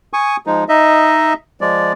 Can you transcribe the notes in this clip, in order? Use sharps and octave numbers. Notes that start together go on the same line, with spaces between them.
G#5 C#6 D#6
F3 G#3 D#4
D#4 D#5 E5
F3 G#3 D5